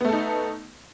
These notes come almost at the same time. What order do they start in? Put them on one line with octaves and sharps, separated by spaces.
B3 A3 A4 D#4